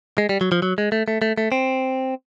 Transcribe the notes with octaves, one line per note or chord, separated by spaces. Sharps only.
G#3
G3
F#3
F3
F#3
G#3
A3
A3
A3
A3
C4